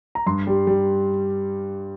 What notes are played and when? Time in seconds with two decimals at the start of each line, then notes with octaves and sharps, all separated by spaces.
0.15 A#5
0.26 G2 C6
0.47 G3
0.67 G3